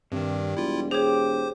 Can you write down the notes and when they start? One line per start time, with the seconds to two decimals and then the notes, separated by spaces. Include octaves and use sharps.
0.12 G2 C3 D#3 G3
0.57 E1 E4 F4
0.91 G4 G#4 C5 C#5